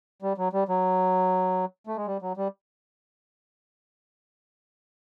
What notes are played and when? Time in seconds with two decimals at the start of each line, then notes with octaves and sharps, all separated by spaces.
0.22 G3
0.38 F#3
0.53 G3
0.69 F#3
1.87 A3
1.97 G#3
2.07 G3
2.22 F#3
2.37 G3